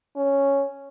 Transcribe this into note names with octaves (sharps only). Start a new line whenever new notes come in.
C#4